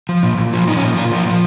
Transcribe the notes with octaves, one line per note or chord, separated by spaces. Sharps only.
F3
A#2
A#2
F3
F3 D#4
C#4
A#2
A#2 F4
F3
F4
F3